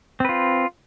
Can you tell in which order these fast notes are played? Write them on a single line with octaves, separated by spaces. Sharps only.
C4 B4 F4